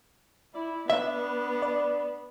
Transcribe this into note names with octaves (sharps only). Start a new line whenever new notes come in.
E4 D5
B3 D4 E5
D5